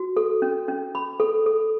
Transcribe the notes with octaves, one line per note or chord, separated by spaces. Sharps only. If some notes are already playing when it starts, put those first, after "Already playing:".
Already playing: F#4
A4
C#4
C#4
B5
A4
A4